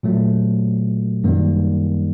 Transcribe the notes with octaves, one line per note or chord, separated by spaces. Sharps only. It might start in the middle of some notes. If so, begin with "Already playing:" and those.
A#2 F#3 A3
F#2 D#3 G3 A#3